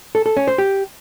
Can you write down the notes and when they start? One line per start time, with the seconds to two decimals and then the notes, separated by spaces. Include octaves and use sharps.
0.15 A4
0.26 A4
0.37 C#4
0.47 C5
0.58 G4